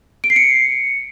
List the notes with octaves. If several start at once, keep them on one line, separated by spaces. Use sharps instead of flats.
D7
C7
C#7